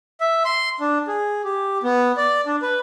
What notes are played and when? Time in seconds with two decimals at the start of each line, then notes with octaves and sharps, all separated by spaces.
0.21 E5
0.45 C6
0.80 D4
1.08 G#4
1.44 G4
1.83 B3
2.17 D5
2.46 D4
2.62 B4